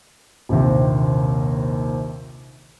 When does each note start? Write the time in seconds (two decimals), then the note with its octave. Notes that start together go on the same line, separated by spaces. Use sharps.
0.49 A#1 D#2 C3